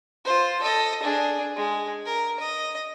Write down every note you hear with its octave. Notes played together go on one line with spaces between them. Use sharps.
F4 C5
A4 D#5
D4 G#4
G#3
A#4
D#5